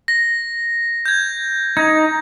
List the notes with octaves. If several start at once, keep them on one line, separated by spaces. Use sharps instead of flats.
A#6
G6 G#6
D#4 G#6